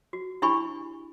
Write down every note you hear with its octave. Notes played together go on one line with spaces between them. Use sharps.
F#4
D4 E4 G4 G#5 B5 C#6